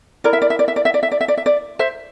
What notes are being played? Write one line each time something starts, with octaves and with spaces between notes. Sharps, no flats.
E4 A#4 D5
E5
D5
E5
D5
E5
D5
E5
D5
E5
D5
E5
D5
E5
D5
C5 E5